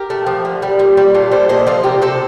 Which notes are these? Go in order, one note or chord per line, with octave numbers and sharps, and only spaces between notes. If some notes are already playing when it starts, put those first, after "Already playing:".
Already playing: G4 A#4
A3
F3
D3
G3
A#2
G3
A#2 F4 A4
G3 A4 C5
A#2 C5 D#5
F3 F4 A4
C3 G4 A#4
C3 A4 C5